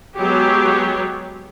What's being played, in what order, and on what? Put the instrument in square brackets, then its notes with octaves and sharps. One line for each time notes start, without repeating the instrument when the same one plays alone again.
[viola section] F#3 G#3 B3 G4 G#4 C#5